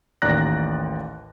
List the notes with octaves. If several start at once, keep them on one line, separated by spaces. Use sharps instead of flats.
A1 D#2 D5 A#5 F#6 A#6